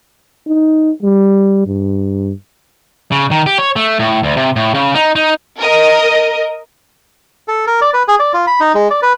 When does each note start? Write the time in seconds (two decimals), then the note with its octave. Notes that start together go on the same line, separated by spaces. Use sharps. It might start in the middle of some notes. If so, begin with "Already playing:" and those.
0.47 D#4
1.03 G3
1.66 G2
3.12 C#3
3.31 D#3
3.46 G4
3.58 C#5
3.76 A3
3.99 A2
4.23 D2
4.37 C3
4.56 A2
4.74 C#3
4.95 D#4
5.16 D#4
5.59 A#4 D#5
7.48 A4
7.67 A#4
7.81 D5
7.94 B4
8.08 G#4
8.20 D5
8.34 F4
8.47 B5
8.60 D#4
8.75 G#3
8.91 D5
9.02 B4